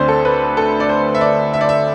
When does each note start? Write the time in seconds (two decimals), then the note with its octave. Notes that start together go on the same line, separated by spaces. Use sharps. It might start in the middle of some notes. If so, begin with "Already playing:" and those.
Already playing: D2 D3 A3 C4 C5 D5
0.08 A4
0.25 B4
0.57 A4
0.80 D5
0.89 C5
1.15 E5
1.21 D5
1.54 E5
1.61 D5
1.69 E5